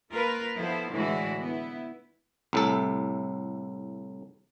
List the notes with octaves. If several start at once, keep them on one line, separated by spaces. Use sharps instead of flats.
A#3 F4 A#4 B4
F3 B3 E4 A4 C5
A2 D3 E3 G#3 E4 F#4
B3 E4
C2 A2 A4